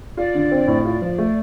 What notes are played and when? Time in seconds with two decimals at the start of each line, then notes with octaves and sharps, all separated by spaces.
0.17 F4 D5
0.35 D3
0.51 C4
0.67 A2
0.84 F4 D5
1.02 F3
1.18 A3